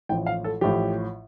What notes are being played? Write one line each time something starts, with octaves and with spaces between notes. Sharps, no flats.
A1 A2 F3 G5
F5
A4
A1 A2 F3 G4